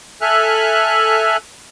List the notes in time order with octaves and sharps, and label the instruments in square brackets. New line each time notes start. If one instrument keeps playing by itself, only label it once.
[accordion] A4 E5 G#5 F6 F#6